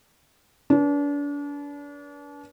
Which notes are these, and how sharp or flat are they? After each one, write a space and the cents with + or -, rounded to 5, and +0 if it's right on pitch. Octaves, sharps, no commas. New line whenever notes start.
D4 -35 B4 -30